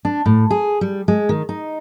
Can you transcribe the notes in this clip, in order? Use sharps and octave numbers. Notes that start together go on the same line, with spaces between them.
D4
A2
G#4
G3
G#3
D#3
D#4